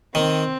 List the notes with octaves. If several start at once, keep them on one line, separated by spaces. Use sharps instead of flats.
D#3 C4